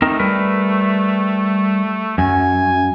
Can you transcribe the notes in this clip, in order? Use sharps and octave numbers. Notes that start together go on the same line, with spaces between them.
A3 C4 D#4 A#4
G3 A#4 B4
F#2 G#5